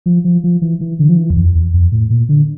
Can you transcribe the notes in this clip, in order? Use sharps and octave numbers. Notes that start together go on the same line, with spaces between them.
F3
F3
F3
E3
E3
D3
F3
E3
E2
F2
E2
F2
A2
A#2
D3